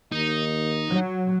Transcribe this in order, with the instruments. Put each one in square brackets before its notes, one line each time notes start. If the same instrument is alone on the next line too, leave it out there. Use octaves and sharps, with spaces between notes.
[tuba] D#2 [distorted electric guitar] D#4
[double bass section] F#3